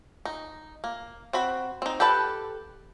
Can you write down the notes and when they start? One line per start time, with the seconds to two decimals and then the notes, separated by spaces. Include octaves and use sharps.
0.25 D#4
0.84 A#3
1.33 C4 F#4 B5
1.82 C4 D#4
2.00 G4 A4 B4 A5